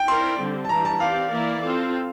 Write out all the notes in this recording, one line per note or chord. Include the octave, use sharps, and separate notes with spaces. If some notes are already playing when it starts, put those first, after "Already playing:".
Already playing: G5
C4 E4 A#4 D5 C6
D3 G3 C4
A5
E3 G3 D4 A#5
A5
C4 G4 D5 F5
E3 A#3 E4 A#4 D5
C4 F4 A4